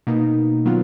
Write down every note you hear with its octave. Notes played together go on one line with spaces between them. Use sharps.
B2 A#3 D#4
D#3 F#3 B3 F4